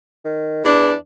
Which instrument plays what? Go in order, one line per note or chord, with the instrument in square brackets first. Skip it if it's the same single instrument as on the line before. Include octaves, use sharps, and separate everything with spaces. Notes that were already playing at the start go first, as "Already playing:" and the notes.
[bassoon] D#3
[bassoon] E2 [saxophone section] E3 D4